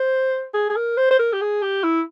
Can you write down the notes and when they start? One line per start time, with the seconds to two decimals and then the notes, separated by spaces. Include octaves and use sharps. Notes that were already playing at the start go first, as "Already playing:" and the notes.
Already playing: C5
0.54 G#4
0.70 G#4
0.76 A#4
0.97 C5
1.11 C5
1.19 A#4
1.33 G4
1.41 G#4
1.62 G4
1.84 E4